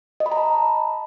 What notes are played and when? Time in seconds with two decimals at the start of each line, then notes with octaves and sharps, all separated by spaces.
0.20 D#5
0.26 B5
0.32 A#5
0.37 A5